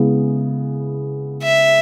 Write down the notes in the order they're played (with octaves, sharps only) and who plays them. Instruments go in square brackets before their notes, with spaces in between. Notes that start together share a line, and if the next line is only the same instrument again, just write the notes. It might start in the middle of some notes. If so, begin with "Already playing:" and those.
Already playing: [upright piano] C#3 G#3 B3 E4
[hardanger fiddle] E5